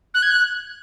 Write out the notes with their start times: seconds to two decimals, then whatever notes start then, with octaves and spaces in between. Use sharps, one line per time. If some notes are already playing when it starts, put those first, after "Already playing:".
0.14 F#6
0.23 G#6
0.31 F#6